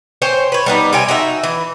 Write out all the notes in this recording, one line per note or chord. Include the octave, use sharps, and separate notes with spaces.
C5 C#5 G5 G#5
B4 C#5
G3 B3 D#4
C3 C#5 G5 G#5
D#4 F#4 E5
E3